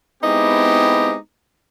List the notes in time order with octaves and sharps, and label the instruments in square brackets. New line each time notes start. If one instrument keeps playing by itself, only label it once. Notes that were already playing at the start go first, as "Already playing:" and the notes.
[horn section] G#3 B3 C4 D#4 E4 G4